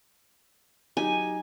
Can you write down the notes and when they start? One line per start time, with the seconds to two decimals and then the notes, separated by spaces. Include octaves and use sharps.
0.97 F#3 D#4 G4 G#5